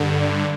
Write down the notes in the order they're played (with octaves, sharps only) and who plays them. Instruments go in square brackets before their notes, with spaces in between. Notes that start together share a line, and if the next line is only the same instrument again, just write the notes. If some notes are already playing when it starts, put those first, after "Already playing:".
Already playing: [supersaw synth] G2 D3